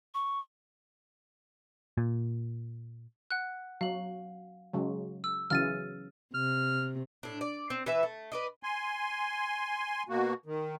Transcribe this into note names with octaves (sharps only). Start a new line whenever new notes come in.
C#6
A#2
F#5 F#6
F#3 F5 F#7
C#3 F#3 G#3
E6
C#3 E3 F#3 F6 A6 D#7
C3 F6
A2 D4
D5
C4
E3 B4 E5
A3
B4 D5 D#5
G#5 C6
B2 A#3 F#4
D#3